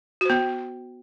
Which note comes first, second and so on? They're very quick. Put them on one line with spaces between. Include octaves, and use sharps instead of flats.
F#4 C5 B3